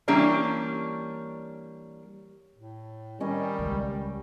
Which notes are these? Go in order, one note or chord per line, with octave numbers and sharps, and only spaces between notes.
E3 G3 A#3 C#4 D4
A2
D#3 G3 C#4 D#5
C#2 G#3